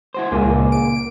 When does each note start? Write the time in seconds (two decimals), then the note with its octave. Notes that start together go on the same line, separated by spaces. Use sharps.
0.14 E4 F#4 C5
0.32 C#2 A#2 A#3 G#4
0.72 D7